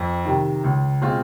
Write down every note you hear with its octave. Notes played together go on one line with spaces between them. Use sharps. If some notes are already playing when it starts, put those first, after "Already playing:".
Already playing: F2
C3 D#3
C#2
B2 G#3 C4 F4